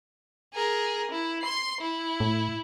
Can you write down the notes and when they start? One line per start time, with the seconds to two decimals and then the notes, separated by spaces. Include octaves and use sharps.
0.54 G#4 A#4
1.11 E4
1.42 C6 C7
1.81 E4
2.20 A2